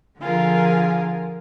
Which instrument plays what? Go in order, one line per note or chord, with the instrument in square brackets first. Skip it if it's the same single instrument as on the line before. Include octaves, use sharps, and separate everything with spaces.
[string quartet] D3 F3 F4 G#4 A#4